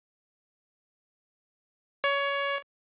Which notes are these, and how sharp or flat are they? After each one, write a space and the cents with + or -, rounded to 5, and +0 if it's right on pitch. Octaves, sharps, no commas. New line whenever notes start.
C#5 +20